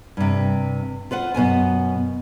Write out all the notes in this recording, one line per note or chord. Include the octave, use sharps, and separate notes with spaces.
G2 C3
F4 B4 C5 F#5
F#2 B2 B3 G#5